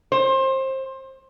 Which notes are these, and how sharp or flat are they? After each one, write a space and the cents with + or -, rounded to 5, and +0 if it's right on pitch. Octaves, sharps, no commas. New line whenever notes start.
C5 +25